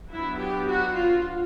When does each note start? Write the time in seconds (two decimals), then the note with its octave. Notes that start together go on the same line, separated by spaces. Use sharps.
0.10 F#3 B3 D4 E4
0.39 G4
0.67 F#4
0.95 F4